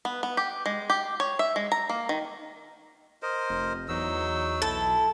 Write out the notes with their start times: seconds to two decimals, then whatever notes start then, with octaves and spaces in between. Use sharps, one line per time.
0.05 B3
0.23 B3
0.37 G4
0.66 G#3
0.90 G4
1.20 C#5
1.39 E5
1.56 G#3
1.72 A#5
1.89 A#3
2.09 D#3
3.22 A#4 C5 D#5
3.50 F1
3.89 E2 F#3 D#4 E6
4.62 B1 E4 A4